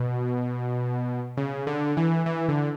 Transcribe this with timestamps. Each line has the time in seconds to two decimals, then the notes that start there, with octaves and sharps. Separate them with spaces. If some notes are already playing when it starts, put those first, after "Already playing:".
Already playing: B2
1.37 C#3
1.67 D3
1.97 E3
2.26 E3
2.48 D3